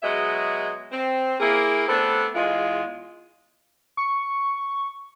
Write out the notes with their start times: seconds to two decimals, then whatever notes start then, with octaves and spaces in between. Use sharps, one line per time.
0.03 B2 F#3 G#3 G#4 D#5 E5
0.92 C4
1.40 A#3 E4 G#4
1.88 A3 B3 C4 D4 A4
2.35 E2 G#3 F4
3.97 C#6